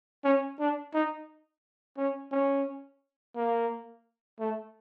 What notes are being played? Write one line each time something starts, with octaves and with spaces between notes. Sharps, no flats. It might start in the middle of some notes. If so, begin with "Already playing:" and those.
C#4
D4
D#4
C#4
C#4
A#3
A3